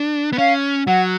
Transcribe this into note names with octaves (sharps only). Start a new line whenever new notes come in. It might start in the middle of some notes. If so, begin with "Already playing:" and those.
Already playing: D4
B3
C#4 F5
F#3 F#5